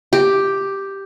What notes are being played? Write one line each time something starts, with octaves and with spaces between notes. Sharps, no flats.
G4